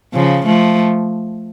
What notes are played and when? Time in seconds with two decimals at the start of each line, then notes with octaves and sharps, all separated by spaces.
0.14 C#3 F3
0.46 F3 A3